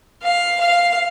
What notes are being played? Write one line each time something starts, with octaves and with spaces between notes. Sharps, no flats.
F5
F5